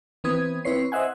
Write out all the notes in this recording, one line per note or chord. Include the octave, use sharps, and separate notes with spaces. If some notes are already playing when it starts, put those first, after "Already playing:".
E3 B3 C4 B4 D#6 G#6
C4 E4 B4 C#5 C7
C5 D#5 E5 F#5 G#5